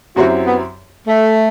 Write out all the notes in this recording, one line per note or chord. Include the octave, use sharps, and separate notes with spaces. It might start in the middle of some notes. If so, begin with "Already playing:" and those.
F#2 F#3 C4 E4 F#4 G4
B3
A3